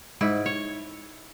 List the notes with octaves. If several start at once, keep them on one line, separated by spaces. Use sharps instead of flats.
G#2 E4
C#5